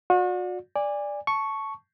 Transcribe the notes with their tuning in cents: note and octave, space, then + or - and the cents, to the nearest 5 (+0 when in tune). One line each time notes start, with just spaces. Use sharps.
F#4 -40 D5 +0
D5 +0 G#5 -25
A5 +0 C#6 +0